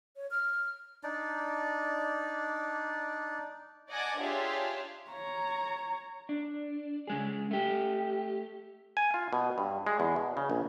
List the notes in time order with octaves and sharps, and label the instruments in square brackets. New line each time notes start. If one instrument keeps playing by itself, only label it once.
[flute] C#5
F6
[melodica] D4 D#4 D5
[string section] D5 D#5 F#5 G#5 A5 D6
D4 F4 G4 G#4 C#5 E5
[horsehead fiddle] C#5 A#5
[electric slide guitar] D4
C#3 G#3 G#4
A3 G4
[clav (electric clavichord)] G#5
F4
B2
G2
G#3
E2
B2
C#3
A#1